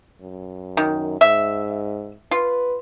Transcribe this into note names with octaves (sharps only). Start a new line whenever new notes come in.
F#2
D#3
G#2 E5
F4 B4